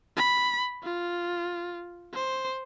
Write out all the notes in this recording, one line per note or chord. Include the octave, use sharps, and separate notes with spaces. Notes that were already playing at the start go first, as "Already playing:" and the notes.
B5
F4
C5